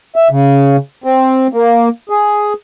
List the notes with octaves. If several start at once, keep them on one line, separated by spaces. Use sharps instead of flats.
E5
C#3
C4
A#3
G#4